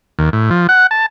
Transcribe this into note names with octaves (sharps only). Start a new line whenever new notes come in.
D#2
A2
F3
F#5
A5